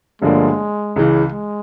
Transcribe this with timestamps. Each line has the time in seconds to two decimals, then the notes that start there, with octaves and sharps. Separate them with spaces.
0.22 G1 G2 D3 F3 G#3 A#3
0.96 C#2 C#3 E3
1.32 G#3